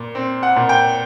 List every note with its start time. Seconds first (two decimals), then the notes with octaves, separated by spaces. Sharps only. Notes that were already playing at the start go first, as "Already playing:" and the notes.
Already playing: A#2
0.15 C4
0.43 F#5
0.56 A#2
0.69 G5